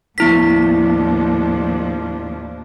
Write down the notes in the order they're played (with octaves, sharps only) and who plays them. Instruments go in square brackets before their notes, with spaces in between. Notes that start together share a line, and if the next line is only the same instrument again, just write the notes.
[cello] D#2 A2 [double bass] F3 D4 [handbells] B3 E4 B6